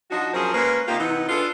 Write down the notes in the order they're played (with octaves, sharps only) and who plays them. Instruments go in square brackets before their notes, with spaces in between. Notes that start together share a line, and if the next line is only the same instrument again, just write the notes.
[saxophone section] F3 D4 D#4 F#4
F3 F#3 C#4 G#4 A#4 C5
G#3 A#3 C#4 A#4 B4
C3 A#3 D#4 F4 G4
C3 E3 B3 D#4
D4 F4 G#4 A4 B4